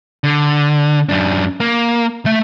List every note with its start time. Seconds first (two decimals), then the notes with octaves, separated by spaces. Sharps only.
0.24 D3
1.09 F#2 D4
1.60 A#3
2.26 A3 E5